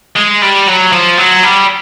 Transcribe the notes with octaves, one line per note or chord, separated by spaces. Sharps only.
G#3
G3
F#3
F3
F#3
G3